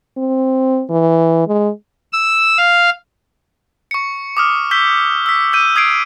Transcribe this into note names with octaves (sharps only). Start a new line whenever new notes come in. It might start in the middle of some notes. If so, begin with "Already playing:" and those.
C4
E3
G#3
E6
F5
C#6 C#7
D6 D#6 F6
E6 G6 B6 G7
E6 B6
E6 G6 D#7
D#6 G#6 C7 D7